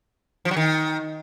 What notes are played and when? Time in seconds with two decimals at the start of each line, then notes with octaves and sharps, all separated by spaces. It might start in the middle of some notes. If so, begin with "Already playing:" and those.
0.45 F3
0.51 F#3
0.57 D#3